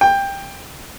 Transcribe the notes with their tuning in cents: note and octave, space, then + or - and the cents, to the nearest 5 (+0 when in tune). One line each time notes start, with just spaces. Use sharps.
G5 +15